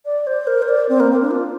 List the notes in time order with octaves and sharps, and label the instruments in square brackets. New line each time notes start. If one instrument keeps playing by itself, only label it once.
[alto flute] D5
C5
A#4
C5
D5
C4
A#3
C4
D4
F4